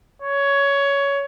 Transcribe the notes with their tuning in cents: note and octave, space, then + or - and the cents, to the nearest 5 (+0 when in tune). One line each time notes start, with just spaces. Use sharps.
C#5 +15